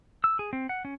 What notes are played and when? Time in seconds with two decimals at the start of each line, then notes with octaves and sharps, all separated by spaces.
0.24 E6
0.39 G#4
0.53 C4
0.69 F#5
0.85 C#4